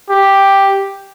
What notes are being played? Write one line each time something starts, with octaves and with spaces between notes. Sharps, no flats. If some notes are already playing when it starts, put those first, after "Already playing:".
G4